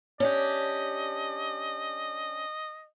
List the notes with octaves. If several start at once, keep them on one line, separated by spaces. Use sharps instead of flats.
C#4 D4 G4 D#5